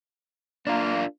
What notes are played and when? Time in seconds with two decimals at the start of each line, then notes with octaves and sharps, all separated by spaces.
0.67 A#3 D4 F4